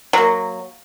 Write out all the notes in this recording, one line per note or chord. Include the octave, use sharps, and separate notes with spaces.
F#3 A#3